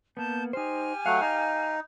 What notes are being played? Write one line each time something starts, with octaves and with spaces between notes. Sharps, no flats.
A#3 B3 A5 G6
D#4 G4 C5 G#5 F6
F#3 A3 F5 F#5
D#4 F5